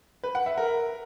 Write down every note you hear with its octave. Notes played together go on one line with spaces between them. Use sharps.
B4
F#5
E5
A#4